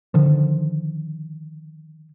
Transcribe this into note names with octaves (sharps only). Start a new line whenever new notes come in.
D3 D#3 F3